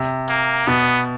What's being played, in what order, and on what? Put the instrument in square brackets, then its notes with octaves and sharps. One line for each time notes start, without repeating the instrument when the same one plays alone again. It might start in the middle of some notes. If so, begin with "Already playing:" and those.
Already playing: [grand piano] C3
[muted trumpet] A#3
[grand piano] B2 [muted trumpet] B3